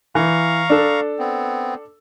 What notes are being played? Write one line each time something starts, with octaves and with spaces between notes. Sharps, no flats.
E3 F5 A#5 C#6
D4 A4
B3 C4